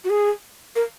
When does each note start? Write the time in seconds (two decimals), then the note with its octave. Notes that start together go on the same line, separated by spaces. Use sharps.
0.04 F#4
0.10 G#4
0.76 A#4